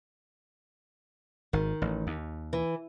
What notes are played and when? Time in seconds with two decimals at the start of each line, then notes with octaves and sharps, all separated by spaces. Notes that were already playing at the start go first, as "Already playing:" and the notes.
1.53 G#1 D#3
1.82 A1
2.07 D#2
2.53 E3